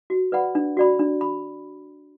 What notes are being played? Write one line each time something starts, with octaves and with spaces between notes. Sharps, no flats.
F#4
B4 D5 F#5 B5
D4
F#4 D5 B5
D4
B5